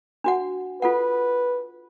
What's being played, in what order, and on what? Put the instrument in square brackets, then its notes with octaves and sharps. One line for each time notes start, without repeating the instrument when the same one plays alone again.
[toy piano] D4 F#4 F#5
[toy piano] F4 A4 F#5 [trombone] B4